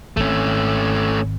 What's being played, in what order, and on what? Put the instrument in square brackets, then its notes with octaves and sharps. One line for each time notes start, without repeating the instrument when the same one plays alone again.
[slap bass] G#1 C4 [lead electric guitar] A3 C#4